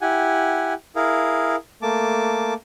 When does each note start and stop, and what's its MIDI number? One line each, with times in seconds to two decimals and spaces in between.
0.01 0.74 64
0.01 0.74 67
0.01 0.74 78
0.01 0.74 80
0.96 1.56 64
0.96 1.56 68
0.96 1.56 70
0.96 1.56 77
1.82 2.54 57
1.82 2.54 58
1.82 2.54 81
1.82 2.54 86